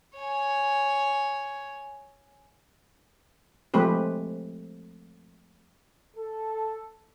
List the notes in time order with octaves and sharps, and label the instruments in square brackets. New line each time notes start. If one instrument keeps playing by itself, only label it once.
[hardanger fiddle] C#5 G#5
[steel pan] F3 G#3 A3 C4 G4 B4
[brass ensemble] A4